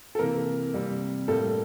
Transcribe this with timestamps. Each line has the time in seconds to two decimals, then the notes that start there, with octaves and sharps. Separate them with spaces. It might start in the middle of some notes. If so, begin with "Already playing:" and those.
0.15 A4
0.19 C3 E3 A#3 A#4
0.74 C3 G3 A#3
1.28 A2 G3 A#3 A4